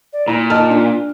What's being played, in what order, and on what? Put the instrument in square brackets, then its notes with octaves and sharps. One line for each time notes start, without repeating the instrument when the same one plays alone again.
[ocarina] D5
[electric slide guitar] A#2 [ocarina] E4 [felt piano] A#5
[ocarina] F4 [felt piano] D#5 A5 F6
[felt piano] D4